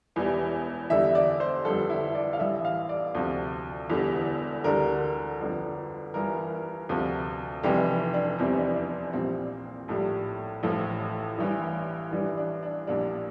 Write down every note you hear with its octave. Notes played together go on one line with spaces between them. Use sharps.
E1 E2 E3 G3
E2 D3 G3 E5
D5
C5
G1 F2 D3 G3 A4
E4
D5
F5
A1 G2 E3 G3 E5
F5
D5
D2 C3 F3
E1 E2 D3 G3
D2 D3 G3 A#4
G1 F2 D3
G1 G2 E3 A#4
D2 C3 F3
F1 F2 C3 E3 G3 G4
D4
F1 E2 C3 E3 G3 C4
D4
D4
A#1 A#2 G3 C4
A#1 A2 G3
A1 A2 F3
A1 G2 E3
A1 G2 E3 G3 D4
D4
D4
A#1 A#2 G3 D4